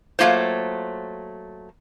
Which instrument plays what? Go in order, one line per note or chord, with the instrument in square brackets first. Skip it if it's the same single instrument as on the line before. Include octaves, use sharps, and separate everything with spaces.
[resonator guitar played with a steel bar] F#3 A3 A#3 F4 C5